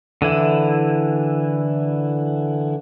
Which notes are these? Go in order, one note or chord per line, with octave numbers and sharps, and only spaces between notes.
D3 E3 E4